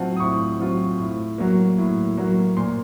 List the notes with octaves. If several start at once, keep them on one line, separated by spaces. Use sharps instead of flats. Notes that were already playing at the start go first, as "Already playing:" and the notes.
Already playing: A2 F#3 C4 F4 F#5 A5
D#6
A2 C#6
F#3 C4 F4
A2
F#3 A#3
A2
F#3 A#3
A#2 C6